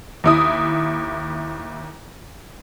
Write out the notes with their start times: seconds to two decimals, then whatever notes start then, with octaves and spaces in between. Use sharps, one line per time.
0.24 D#2 E4 D#6